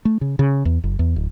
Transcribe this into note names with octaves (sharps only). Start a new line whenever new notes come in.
A3
C#3
C#3
E2
F#1
E2
D1